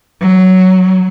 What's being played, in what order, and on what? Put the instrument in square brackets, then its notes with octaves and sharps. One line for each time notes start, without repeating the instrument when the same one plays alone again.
[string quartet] F#3